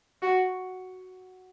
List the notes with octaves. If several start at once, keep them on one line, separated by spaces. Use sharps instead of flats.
F#4